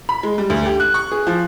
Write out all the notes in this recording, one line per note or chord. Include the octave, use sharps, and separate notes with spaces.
B5
G#3
G3
D2
G4
F#6
C#6
G#4
F3